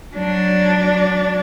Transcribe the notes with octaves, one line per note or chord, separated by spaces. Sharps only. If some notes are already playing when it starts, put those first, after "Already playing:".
F#3 D4